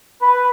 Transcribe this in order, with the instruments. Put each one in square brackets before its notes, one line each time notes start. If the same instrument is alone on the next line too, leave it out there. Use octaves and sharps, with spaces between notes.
[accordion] B4